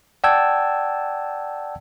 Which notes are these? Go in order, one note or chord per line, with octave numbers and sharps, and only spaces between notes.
D5 F#5 G5 A5 E6 G#6